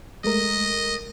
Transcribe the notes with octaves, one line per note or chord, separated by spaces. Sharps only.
G#3 A3 A#4 D#5